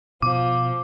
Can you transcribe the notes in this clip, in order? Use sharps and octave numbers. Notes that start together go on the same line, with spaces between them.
B2 F3 D6